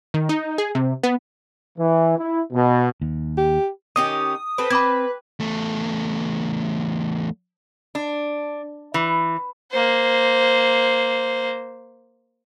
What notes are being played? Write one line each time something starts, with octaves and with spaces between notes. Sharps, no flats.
D#3
D#4
G#4
C3
B3
E3
E4
B2
D#2
G4
D#3 C#4 G4 D#6
C4 A4 B4 C5
C4 B5 D6 G#6
E2 A3
D4
E3
A#3 C5